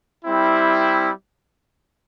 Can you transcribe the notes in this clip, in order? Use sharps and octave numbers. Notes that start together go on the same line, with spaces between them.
G3 C4 E4